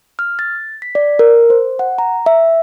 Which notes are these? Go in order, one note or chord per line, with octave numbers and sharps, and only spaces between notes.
F6
A6
B6
D5
A#4
C5
F#5
A#5
E5